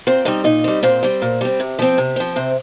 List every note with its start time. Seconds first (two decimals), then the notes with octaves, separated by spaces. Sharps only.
0.07 A#2 C4 C5
0.25 G3 C4 D#4 D#5
0.44 A#2 D#4 D#5
0.64 G3 C4
0.83 A#2 C4 C5
1.03 G3 C4
1.22 A#2
1.41 G3 C4
1.60 C3
1.79 F3 C4
1.98 C3
2.16 F3 C4
2.36 C3 C4 C5